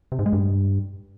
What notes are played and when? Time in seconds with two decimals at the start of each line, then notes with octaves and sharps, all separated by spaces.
0.12 C3
0.19 G#2
0.26 G#3
0.33 G2